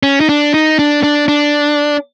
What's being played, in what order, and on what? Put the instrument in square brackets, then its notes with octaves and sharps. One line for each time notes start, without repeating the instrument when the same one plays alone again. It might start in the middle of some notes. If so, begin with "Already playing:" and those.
[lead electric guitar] C#4
D#4
D4
D#4
D4
D4
D4